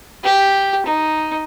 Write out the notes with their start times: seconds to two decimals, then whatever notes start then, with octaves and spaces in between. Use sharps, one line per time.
0.24 G4
0.86 D#4